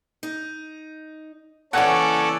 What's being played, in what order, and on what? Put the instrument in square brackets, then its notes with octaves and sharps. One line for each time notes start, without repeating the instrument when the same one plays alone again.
[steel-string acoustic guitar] D#4
[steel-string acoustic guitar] A#2 C#3 E3 [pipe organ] C#4 A4 [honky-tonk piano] C#5 F#5 [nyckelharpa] D5